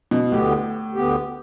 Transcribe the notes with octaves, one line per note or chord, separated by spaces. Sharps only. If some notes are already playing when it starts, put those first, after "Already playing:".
B2
D2 A2 D3 B3 G4
D2 D3 B3 G4